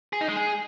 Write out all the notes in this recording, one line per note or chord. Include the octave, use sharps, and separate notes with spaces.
G#4
D#4
G#3
G#4